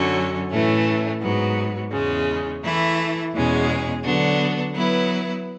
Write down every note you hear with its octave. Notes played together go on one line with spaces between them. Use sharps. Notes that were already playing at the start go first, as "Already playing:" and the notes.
Already playing: F#2 D3 F#3 C#4
A2 E3 A3 C#4
G#2 F#3 B3
E2 C#3 G#3
E3 A3 E4
E2 B2 G#3 C#4 G#4
D3 F#3 B3 D4 F#4
F#3 B3 E4 B4